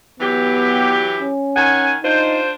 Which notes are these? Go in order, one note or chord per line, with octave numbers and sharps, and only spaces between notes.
E3 F#3 B3 G4
C#4
D#3 F#5 G#5
D4 D#4 F4 C5